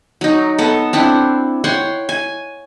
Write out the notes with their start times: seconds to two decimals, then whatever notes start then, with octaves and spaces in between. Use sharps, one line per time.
0.21 F#3 D#4
0.58 B3 A4
0.93 C4 D4 E4 F#5
1.64 C#5 F#5 G5 C6
2.09 G#5